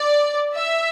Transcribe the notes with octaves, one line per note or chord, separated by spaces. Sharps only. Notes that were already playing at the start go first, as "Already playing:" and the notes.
Already playing: D5
E5